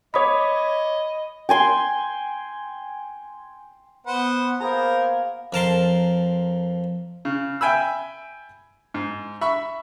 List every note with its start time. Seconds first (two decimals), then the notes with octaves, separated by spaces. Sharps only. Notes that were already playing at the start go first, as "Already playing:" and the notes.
0.14 C#5 D#5 B5 D6 D#6 B6
1.49 G5 G#5 C6
4.07 B3 B4 C5 F#5
4.60 A#3 B3 G#4 A#4 C5 A#5
5.53 F2 A#4 A5 C6
7.25 C#3
7.61 E5 G5 G#5 B5 E6
8.94 G#2
9.41 E5 B5 C#6